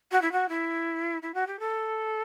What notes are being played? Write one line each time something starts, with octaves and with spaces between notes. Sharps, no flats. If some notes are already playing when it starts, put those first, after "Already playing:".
F#4
E4
F#4
E4
E4
F#4
G4
A4